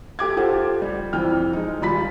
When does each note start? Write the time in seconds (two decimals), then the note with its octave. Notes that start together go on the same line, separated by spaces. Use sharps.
0.19 A3 G4 D6 G#6
0.37 F4 G4 A4 C5 F#5
0.82 G3
1.13 F2 E3 G5 F6
1.53 G#3 D#4
1.81 D#1 G3 F4 B5 B6